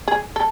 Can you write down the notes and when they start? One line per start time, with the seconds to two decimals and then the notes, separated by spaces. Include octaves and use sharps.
0.08 G#4
0.36 A4